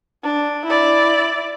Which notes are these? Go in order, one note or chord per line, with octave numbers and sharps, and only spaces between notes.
D4
E4 D5